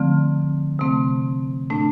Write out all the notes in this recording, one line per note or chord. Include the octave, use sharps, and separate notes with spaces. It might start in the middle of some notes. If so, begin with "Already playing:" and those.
Already playing: D3 F3 A3 C4
C3 A3 C4
A2 A3 D4